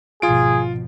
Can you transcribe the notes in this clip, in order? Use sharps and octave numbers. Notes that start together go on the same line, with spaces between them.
G#1 B2 F3 F4 G#4 D7